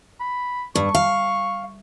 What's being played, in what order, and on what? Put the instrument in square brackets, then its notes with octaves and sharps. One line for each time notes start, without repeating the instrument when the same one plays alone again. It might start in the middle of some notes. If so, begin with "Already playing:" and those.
[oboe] B5
[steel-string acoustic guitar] G2 [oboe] C#6
[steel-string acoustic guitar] F5